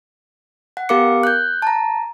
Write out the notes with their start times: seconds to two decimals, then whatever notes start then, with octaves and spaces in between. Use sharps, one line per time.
0.77 F#5
0.89 B3 G4 A#4 F5 D6 C#7
1.23 F#6 G6
1.62 A5 A#5